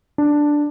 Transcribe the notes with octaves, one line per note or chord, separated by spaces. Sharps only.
D4